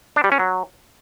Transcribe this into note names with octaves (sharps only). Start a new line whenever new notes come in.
D4
G3
C#4
F#3